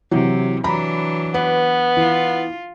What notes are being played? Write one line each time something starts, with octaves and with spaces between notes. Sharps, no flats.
C3 E3 F#3
E3 F#3 D4 A#5 B5
B3 B4
E3 F4